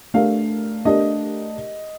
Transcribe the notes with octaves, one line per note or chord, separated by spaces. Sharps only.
A3 D4 G4 A#4 F5
A3 D4 G4 A#4 D#5